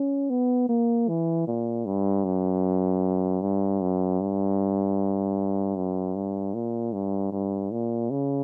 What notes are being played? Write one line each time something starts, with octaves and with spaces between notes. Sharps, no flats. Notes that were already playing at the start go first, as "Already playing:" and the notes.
Already playing: C#4
B3
A#3
E3
A#2
G2
F#2
G2
F#2
G2
F#2
G2
A#2
G2
G2
A#2
C#3